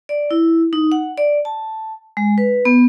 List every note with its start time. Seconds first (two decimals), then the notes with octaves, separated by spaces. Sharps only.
0.09 D5
0.31 E4
0.73 D#4
0.92 F#5
1.18 D5
1.45 A5
2.17 G#3
2.38 B4
2.65 B3